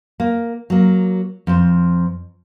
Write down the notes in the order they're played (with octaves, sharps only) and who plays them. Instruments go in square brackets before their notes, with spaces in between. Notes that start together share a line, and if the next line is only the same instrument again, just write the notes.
[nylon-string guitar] A#3
F#3 A#3
F2 C5